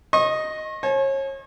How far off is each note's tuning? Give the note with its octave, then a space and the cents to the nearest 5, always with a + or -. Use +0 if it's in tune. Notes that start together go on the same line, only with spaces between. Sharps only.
D#5 +0 C#6 -40
C#5 -35 G#5 +45